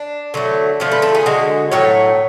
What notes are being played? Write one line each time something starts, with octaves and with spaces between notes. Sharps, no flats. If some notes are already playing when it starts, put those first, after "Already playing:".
Already playing: D4
D3 F#3 A3
D3 F3 A3
B4
A4
G#4
D3 G#3 F#4
A2 F#3 A3 C#5